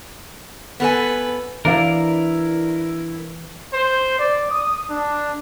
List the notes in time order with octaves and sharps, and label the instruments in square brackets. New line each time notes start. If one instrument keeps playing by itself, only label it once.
[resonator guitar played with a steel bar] B3 A4 G#5 [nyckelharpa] B4
[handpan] E3 [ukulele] D4 D5 F5 [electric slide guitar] E4 A#4
[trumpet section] C5
D5
D#6
D4